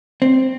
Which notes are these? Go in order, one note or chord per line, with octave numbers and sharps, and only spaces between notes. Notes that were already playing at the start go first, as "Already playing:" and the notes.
C4